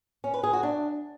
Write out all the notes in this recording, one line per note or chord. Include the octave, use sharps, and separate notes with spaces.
C#4
B4
G#4
F#4
D4